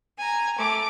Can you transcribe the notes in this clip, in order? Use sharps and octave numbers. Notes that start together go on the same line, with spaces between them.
G#5 A#5
A3 D6